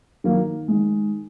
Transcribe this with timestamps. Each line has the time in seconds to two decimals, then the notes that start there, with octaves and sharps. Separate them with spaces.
0.24 D#3 F#3 A#3
0.68 D#3 G#3